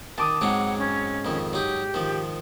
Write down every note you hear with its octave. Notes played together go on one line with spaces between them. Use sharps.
D#3 A5 D6 D#6
G#2 F#3 G#3 C4 F#5
C#4
F2 D#3
F#3 D#4 G4
D#3 F3